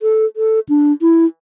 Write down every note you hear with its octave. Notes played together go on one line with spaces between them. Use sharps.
A4
A4
D4
E4